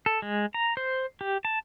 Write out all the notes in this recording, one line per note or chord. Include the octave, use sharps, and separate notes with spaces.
A4
G#3
A#5
C5
G4
A5